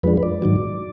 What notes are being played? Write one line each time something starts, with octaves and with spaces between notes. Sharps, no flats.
F2 F3 G#3 D4 B4
B4
D5
G#2 D#3 F#3